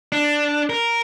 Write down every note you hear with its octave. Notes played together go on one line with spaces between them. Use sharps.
D4
A#4